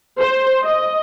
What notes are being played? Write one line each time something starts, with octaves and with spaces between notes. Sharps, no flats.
C5
D#5